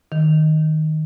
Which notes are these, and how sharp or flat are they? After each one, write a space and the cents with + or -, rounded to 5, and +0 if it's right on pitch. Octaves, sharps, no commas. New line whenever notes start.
D#3 +0